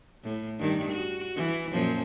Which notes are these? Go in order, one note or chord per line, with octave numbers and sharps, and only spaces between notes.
A2
G2 D#3
F#4
E3
F#2 A#2 F3